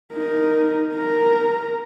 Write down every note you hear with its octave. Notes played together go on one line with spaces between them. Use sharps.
D#4 A#4
A#4 A#5